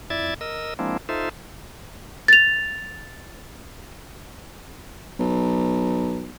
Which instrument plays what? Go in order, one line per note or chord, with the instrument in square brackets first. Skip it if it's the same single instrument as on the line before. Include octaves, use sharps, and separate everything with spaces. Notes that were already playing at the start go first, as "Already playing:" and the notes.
[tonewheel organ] F2 E4 D5 E5 G#6 A6
A#4 D#5 E6
F3 G#3 A#3 C4 D4 E4
D#4 F4 A4 C5 E5
[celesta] A6 F7
[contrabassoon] B1